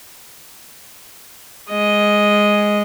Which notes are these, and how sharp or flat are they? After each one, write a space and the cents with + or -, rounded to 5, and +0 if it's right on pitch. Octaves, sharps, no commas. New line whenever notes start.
G#3 +0 D#5 +0